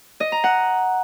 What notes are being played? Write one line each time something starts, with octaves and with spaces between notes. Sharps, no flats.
D#5
A#5
F#5